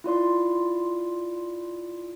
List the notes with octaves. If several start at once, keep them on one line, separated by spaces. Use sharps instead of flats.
E4 F4 D5 C6